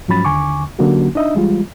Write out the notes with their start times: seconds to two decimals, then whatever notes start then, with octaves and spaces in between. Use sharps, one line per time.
0.08 G#2 F3 F#3 C#4 B5 A6
0.25 D#2 D3 G#5 C#6 D6
0.78 D3 F#3 A#3 C#4 F#4 G4
1.15 D4 D#4 D#5 E5
1.35 E3 G3 G#3 F4